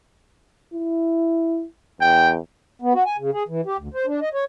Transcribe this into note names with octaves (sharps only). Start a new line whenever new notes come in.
E4
E2 G5
B3
F#4
G#5
C#3
G#4
E3
G4
D2
C5
D4
D#5
C#5